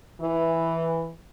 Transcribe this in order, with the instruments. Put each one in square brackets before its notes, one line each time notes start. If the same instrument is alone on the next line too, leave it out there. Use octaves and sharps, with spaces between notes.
[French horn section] E3